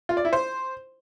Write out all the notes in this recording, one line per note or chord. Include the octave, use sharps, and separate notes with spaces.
F4
D5
E4
C5